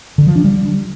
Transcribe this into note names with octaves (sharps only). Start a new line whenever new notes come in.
D3
F3
D4
G3